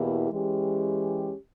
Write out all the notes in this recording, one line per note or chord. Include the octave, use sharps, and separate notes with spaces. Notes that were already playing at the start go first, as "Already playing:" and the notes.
Already playing: E2 B2 A#3 E4 G4
E3 G#3 C#4 G4